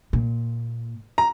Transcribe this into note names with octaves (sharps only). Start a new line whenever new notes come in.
A#2
A#5